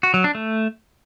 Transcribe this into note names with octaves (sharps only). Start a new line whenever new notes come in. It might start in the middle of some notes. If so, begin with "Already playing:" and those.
F#4
F#3
D4
A3